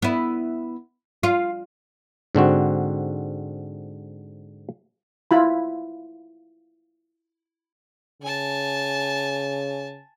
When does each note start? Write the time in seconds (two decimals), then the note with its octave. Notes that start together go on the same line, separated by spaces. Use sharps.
0.02 B3 E4
1.23 F4
2.35 G#2 D3 C4 F#4
5.31 E4 F4 B5
8.22 C#3 G#5 A5